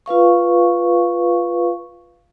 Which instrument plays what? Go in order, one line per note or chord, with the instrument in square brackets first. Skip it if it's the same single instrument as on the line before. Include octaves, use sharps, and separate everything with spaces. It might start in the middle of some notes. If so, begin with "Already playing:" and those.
[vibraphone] F4 B4 F5 C#6